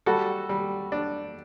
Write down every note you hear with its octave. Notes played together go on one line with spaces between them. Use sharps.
G3 F#4 A4
G3
D4